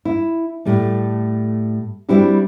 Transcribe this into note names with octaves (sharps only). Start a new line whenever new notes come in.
E4
A2 G3 A3
G3 C4 D4 E4 F#4 G4